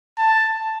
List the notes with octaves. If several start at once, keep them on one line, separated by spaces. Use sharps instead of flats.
A5